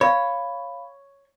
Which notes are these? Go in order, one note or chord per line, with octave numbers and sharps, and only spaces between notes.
C#5 F5 B5